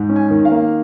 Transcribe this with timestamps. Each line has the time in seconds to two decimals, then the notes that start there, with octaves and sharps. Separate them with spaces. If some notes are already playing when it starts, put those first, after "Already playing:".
Already playing: G#2
0.09 C#4
0.16 G#5
0.31 D#3
0.45 F5
0.51 A#3